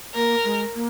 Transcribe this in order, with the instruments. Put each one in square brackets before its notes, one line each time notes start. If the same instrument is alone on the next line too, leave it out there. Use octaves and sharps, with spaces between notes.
[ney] A#3 [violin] A#4
[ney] G#3
A#3